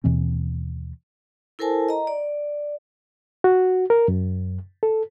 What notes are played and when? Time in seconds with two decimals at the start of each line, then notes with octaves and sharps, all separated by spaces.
0.04 D#2 B2 E3 C4
1.59 E4 A4 A#4 C5 G#5 A5
1.89 D#5 A#5
2.07 D5
3.44 F#4
3.90 A#4
4.08 F#2
4.83 A4